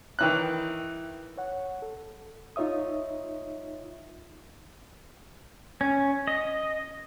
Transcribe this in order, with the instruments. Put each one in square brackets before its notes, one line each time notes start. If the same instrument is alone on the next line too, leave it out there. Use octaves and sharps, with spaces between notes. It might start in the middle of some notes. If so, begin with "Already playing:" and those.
[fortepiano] D#3 E3 F#6
[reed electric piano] C#5 F#5
A4
D#4 F4 C#5 E5 D#6
[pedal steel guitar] C#4
D#5